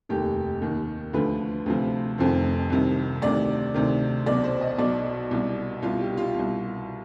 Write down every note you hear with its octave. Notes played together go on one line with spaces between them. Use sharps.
F1 D#2 D#3 G4
D#2 D#3
D2 D3 F3 B4
D2 C3 F3
F1 F2 D#3 C5
C2 C3 D#3
D2 C3 D#3 D5
D2 C3 D#3
B1 B2 D5
C5
D#5
B1 B2 D5
C2 B2
C2 B2 F4
G4
F4
C2 B2 F4